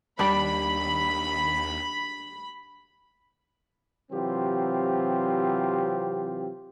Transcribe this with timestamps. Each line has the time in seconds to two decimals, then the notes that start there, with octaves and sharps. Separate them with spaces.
0.19 D#2 G3 D4 B5
4.12 C3 E3 F#3 C4 F4 G4